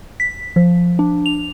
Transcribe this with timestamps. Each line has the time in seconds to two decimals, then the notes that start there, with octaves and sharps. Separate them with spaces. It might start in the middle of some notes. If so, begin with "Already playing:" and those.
0.20 B6
0.56 F3
0.99 D4
1.26 F7